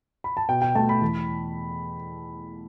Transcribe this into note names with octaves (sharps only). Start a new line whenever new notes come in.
B5
A5
B2 G5
G5
A3 A5
B5
E2